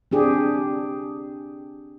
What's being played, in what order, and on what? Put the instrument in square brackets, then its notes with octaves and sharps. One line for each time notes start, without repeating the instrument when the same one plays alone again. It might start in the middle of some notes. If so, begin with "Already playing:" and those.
[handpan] C4 D4 G4 G#4